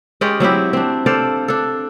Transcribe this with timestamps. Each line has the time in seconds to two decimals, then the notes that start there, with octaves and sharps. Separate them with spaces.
0.21 G#3 C#4 G4 D5
0.40 F#3 C4 E4 G4
0.73 C4 D4
1.06 A4 C5 D5 F5
1.48 D4 A4